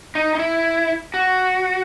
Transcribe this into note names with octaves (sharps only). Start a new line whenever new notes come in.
D#4
D#4
E4
F#4